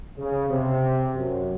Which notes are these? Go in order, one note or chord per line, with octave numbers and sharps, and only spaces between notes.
C#3
C3
F#2